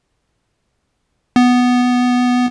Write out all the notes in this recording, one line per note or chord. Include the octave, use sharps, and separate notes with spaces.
B3